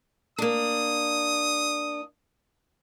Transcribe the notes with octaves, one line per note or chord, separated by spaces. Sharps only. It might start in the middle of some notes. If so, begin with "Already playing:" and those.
A#3 D4 D#6